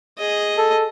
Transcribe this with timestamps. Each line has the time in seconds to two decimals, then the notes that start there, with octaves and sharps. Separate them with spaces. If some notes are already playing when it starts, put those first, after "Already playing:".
0.18 G#4 D#5
0.58 A4